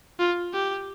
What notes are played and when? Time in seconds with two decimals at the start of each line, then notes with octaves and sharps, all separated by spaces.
0.20 F4
0.53 G4